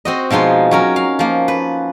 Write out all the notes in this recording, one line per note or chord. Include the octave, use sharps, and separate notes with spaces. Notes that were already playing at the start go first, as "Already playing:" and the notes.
C4 F#4 D#5
B2 F3 G#3 D#4 C6
F#3 C#4 A#4
F5
F3 A#3
B4